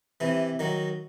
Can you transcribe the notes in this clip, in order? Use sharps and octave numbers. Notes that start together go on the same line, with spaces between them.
C3 E3
D#3 F#3